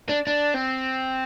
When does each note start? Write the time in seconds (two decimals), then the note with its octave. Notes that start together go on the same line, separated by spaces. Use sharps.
0.09 D4
0.27 D4
0.54 C4